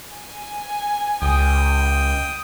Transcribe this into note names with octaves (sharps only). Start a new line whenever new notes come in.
G#5
C#2 G5 D#6